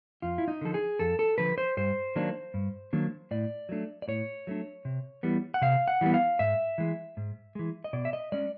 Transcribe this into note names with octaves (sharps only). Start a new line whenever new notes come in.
F2 F4
E4
D#4
D3 F3 A4
G#4
F2 A4
A4
D3 F3 B4
C5
G2 C5
D#3 F#3 A#3 D4
G2
D#3 F#3 A#3 D4
A2 D5
F#3 A3 D4
D5
A2 C#5
F#3 A3 D4
C3
E3 G3 B3
F#5
C3 F5
F#5
E3 G3 B3
F5
G#2 E5
E3 G#3
G#2
E3 G#3
D#5
B2 D5
E5
D#5
G#3 C#4 D5